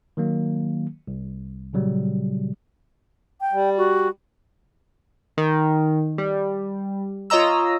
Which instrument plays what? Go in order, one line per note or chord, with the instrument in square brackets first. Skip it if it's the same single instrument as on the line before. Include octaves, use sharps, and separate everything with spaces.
[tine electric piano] D#3 F#3 A#3
C2
A#2 C#3 F#3 G3
[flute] G5
[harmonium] G3
[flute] F#4
[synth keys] D#3
G3
F4 C#5 D#5 A#5 E6